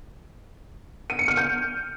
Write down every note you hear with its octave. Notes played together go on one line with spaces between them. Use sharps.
D#7
C#7
F6
G6